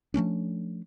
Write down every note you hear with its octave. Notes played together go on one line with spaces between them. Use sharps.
F3 A3 C#4 D4